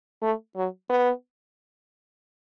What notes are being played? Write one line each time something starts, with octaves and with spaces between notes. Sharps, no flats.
A3
F#3
B3